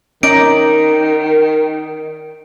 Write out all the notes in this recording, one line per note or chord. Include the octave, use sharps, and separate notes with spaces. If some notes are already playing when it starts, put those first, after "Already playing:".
D#3 C#4 D#4 D5 D#5 D7